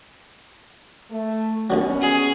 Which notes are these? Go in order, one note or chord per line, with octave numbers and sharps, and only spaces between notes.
A3
D#2 B2 D3 F#3 C#4
G#4